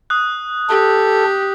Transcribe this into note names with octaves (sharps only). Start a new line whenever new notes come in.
D#6 F#6
G4 A4